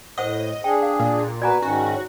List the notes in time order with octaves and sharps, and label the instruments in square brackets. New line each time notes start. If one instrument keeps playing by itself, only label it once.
[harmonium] A2 [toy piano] C5 F#5 D#6 [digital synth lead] D#5
[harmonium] D4 G#4 [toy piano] G5
[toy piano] F5
[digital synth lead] A#2
[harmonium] B3 F#4 B4 [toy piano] D5 G#5 A#5
[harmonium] G#2 D#3 C#4 [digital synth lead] F#4